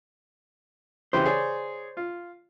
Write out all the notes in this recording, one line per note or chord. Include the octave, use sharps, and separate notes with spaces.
C#3 E3 G4 C5
G#4 C#5 D5
F4